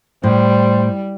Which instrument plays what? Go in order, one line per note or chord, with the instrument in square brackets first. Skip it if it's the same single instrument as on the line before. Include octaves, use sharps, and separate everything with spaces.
[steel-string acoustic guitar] A2 [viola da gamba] G3 [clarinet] C5